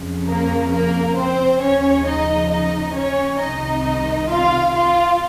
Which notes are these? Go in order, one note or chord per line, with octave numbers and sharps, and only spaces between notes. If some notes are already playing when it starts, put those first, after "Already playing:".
Already playing: F2 C#3 F3
A#3 A#4
A#3 A#4
C4 C5
D#2 C#3 F3 C#4 C#5
D#4 D#5
D#4 D#5
C#4 C#5
C2 C3 D#3 D#4 D#5
F4 F5
F4 F5